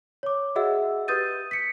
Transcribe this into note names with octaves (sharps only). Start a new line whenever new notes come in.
C#5 D6
F#4 G#4 D#5 E5 F#5 E6
G4 B4 D#6 G6 A6 D#7
B6 C#7